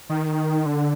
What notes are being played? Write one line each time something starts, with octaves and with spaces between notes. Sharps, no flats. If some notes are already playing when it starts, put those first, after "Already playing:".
D#3
D3